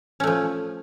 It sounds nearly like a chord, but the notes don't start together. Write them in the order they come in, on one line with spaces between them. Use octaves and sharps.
C#4 A3 F3